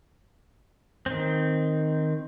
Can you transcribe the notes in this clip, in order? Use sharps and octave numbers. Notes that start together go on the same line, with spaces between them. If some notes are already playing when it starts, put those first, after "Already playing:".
D#3 C4